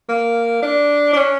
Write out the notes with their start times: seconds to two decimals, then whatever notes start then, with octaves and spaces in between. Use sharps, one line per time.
0.09 A#3
0.63 D4
1.13 D4
1.17 C#4